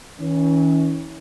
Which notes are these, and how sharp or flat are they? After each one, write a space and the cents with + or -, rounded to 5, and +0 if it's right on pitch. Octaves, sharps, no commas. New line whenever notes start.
E3 -40 C#4 +10